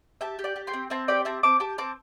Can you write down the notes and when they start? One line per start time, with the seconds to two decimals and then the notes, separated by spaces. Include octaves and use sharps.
0.21 G4 E5 A5
0.39 G4
0.44 D5 G5
0.56 G4
0.67 G5 C6
0.73 C4
0.90 C4 E5 A5
1.08 G4 D5 G5
1.25 C4 E5 A5
1.43 C4 A5 D6
1.60 G4 A5 D6
1.78 C4 A5 D6